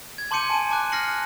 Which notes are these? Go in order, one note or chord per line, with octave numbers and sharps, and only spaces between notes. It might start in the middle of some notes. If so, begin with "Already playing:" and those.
G#6
A5 C6 D6 G6 C#7 D#7
G#5 A5
A5 D6 F#6
F6 F#6 A#6 C7 C#7 F#7